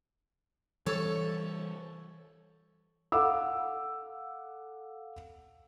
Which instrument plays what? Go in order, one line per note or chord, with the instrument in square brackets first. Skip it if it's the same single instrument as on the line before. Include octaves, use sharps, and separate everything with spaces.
[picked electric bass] E3 G3 [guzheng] A4 C#5 A5
[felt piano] A4 F5 F#5 D6 E6